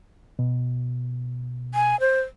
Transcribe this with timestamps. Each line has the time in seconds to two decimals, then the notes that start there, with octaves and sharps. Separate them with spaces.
0.39 B2
1.74 G#5
2.00 C5